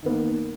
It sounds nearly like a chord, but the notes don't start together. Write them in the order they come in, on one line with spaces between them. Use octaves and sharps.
D#3 B3 A#3